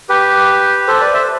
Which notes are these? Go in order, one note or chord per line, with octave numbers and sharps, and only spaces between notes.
G4 B4
A4 C5
B4 D5
C5 E5